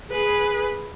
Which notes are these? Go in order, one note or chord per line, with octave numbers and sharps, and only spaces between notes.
G#4 B4